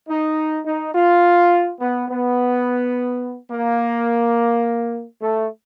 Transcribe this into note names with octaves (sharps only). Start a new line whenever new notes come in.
D#4
D#4
F4
B3
B3
A#3
A3